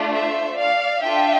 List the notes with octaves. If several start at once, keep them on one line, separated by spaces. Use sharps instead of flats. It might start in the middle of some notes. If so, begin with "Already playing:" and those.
Already playing: A3 D4 F4
C5 E5
D5 F5
D4 F4 A4 E5 G5